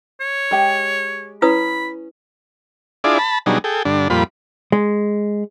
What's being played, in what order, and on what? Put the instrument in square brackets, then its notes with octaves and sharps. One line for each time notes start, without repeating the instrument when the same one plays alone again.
[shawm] C#5
[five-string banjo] G#3 G4 G5
[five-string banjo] C#4 [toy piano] E4 B4 D#6 [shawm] B5
[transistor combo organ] D4 E4 F4 G#4 D5
A5 B5
B2 F#3 G3 D4 D#4 G#4
G#4 A4 G5
G2 D3 D4
F2 A#2 G3 F4 B5
[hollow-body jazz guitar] G#3